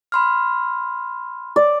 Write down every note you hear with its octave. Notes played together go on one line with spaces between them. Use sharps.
B5 C6 F6
D5